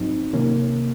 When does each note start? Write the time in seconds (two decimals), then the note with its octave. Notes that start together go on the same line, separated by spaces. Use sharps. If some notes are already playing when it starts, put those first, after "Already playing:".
Already playing: G#2 F#3 C4 D#4
0.33 C3 D#3 A#3 C#4